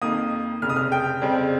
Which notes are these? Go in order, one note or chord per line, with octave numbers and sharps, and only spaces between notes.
F2 D#3 A#3 D#6
F1 F2 C#3 F6
D#6
F6
G5
F2 C#3 G3 C4